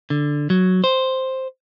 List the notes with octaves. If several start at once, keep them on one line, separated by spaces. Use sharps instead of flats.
D3
F#3
C5